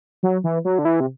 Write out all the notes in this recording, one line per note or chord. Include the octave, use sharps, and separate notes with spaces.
F#3
E3
F#3
D3
E3
C3